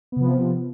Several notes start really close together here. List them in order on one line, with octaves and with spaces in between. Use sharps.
B3 C3 F3